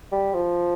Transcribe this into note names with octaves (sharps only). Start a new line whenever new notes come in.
G3
F3